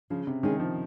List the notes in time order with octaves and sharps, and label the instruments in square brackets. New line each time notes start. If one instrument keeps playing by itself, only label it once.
[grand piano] C#3 [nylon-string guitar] F3
[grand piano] C3
[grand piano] D#3 [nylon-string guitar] G#3 C#4 G#4
[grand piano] F3